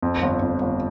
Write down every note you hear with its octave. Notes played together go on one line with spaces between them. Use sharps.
F2
G1
F2
G1